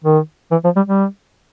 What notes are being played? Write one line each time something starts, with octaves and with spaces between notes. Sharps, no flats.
D#3
E3
F3
G3
G3